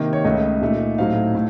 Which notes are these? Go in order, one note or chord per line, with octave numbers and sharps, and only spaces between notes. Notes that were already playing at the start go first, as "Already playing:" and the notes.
Already playing: C3 D#3 A#3 D#4
C#5
C#2 C#3 A3 D#5
A#2 A3 D#4
A2 F#3 C4 D#4 F5
A2